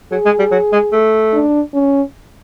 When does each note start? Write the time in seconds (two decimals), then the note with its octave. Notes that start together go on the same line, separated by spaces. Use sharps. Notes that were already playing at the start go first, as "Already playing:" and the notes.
0.12 F#3 G#4
0.25 G#3
0.39 G3
0.51 F#3
0.72 G#3
0.92 A3
1.33 D4
1.74 C#4